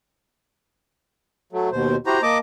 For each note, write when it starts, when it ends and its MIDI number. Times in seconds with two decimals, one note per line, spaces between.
1.53 1.69 54
1.53 1.69 57
1.72 1.96 39
1.72 1.96 47
1.72 1.96 72
2.06 2.18 64
2.06 2.18 66
2.06 2.18 67
2.06 2.21 72
2.06 2.21 82
2.22 2.39 58
2.22 2.38 75
2.22 2.39 81
2.22 2.38 86